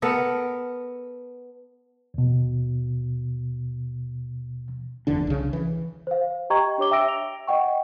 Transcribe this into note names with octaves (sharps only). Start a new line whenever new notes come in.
B3 A4 A#4
D#2 B2
F#1 E2 D3 D4
C2 C#3
E3
C5 F5
G4 D#5 G5 A#5 C#6 G#6
D4 G4 C#5 D6 G7
E5 G5 D6 E6 A#6 D7
F7
D#5 F#5 G5 C#6